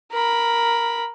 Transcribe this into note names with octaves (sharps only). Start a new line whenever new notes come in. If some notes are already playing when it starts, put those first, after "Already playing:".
A#4 B5